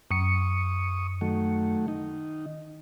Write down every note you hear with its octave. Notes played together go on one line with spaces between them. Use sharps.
F#2 C#6 D#6 C#7
D#3 F#3 A3
D#3 D#4